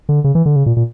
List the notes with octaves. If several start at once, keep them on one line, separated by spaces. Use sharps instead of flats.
D3
C#3
E3
D3
C#3
A#2
A#2